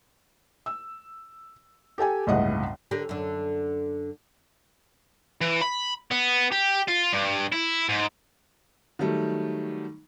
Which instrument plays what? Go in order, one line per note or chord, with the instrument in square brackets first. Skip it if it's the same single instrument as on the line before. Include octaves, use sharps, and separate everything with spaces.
[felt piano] E6
G4 A4 G5 G#5
G1 C#2 A2 D#5 E5 F#5
[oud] D3 G4 A#4
F#2 D3
[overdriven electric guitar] E3
B5
B3
G4
F4
G2
E4
G#2
[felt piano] D#3 F#3 G3 A3